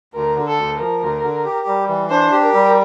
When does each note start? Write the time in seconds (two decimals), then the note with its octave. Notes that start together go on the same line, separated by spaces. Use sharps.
0.14 D2 A#4
0.35 D3
0.47 A4
0.57 D2
0.78 F3 A#4
1.01 D2
1.23 D3
1.44 G4
1.66 G3
1.88 E3
2.10 D4 C5
2.32 G4
2.42 A#4
2.53 G3